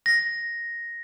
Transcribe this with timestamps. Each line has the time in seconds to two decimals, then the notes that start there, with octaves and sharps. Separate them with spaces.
0.06 A#6